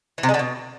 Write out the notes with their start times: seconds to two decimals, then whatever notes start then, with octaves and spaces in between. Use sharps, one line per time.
0.18 E3
0.23 C3
0.29 G#3
0.34 D3
0.39 B2